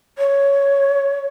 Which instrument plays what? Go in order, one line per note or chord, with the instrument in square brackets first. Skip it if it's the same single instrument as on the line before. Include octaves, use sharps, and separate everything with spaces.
[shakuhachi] C#5